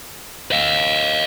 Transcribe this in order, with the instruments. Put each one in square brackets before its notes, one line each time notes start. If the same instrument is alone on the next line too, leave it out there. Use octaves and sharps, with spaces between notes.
[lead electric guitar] D#5 F5